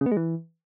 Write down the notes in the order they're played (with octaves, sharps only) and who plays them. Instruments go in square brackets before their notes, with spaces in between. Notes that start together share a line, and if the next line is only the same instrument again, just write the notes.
[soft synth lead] C#3
B3
G#3
E3